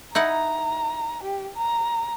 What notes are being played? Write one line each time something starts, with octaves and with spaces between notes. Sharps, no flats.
D#4 E4 F#5 A#5
G4
A#5